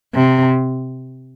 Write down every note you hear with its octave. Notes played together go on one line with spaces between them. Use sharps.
C3